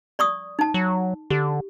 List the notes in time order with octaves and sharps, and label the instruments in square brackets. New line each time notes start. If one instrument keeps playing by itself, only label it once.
[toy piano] D5 C#6 D#6
D#4 A5
[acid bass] F#3
[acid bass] D3 [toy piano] G4